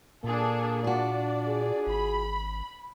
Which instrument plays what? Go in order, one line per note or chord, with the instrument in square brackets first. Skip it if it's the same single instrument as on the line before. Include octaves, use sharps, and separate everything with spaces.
[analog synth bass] A#2 [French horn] A#3 [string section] D4 G#4 A4
[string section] D4 D5 [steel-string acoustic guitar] F4 F#4
[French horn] G#4
[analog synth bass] G#1 [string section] B5